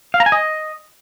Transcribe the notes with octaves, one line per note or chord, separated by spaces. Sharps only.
F5
A#5
G#5
D#5